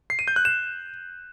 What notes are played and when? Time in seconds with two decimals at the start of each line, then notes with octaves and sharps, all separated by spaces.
0.10 C7
0.19 D#7
0.28 G6
0.36 F#6
0.45 E7